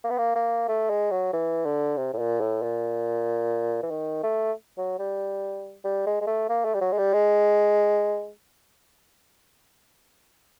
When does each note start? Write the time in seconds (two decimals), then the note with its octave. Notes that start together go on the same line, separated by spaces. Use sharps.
0.04 A#3
0.10 B3
0.18 A#3
0.35 A#3
0.68 A3
0.90 G#3
1.11 F#3
1.33 E3
1.65 D3
1.97 C3
2.13 A2
2.18 A#2
2.40 A2
2.62 A#2
3.82 E3
3.90 D#3
4.23 A3
4.77 F#3
4.99 G3
5.84 G3
6.06 G#3
6.21 G#3
6.27 A3
6.49 A#3
6.64 A3
6.74 G3
6.81 F#3
6.92 G#3
6.98 G3
7.13 G#3